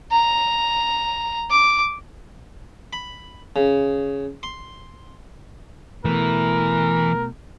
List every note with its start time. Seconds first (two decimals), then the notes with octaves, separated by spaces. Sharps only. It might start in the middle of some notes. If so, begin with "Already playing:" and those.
0.12 A#5
1.51 D6
2.93 B5
3.56 C#3
4.43 C6
6.05 B2 E3 A3 A#4